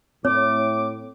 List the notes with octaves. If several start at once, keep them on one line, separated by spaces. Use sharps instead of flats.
A2 C4 C#5 D6